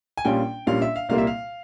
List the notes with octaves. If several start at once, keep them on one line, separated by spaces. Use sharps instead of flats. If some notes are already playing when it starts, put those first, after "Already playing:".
G#5
A#1 A#2 G3 C#4 F4 G5
A#1 A#2 G3 C#4 F4 F5
E5
F5
C2 A#2 G3 A#3 F5
E5
F5